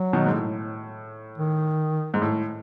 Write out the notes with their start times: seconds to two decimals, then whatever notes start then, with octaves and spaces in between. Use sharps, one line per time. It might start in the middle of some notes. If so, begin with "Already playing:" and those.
Already playing: F#3
0.13 B2 D#3
0.26 G#2
0.33 A2
1.38 D#3
2.14 G#2
2.22 A2